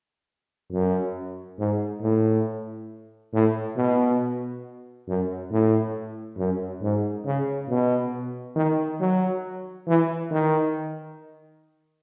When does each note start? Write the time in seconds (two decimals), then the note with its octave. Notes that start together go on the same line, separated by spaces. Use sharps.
0.71 F#2
1.58 G#2
2.01 A2
3.33 A2
3.76 B2
5.08 F#2
5.50 A2
6.37 F#2
6.82 G#2
7.26 C#3
7.69 B2
8.56 D#3
9.00 F#3
9.87 E3
10.30 D#3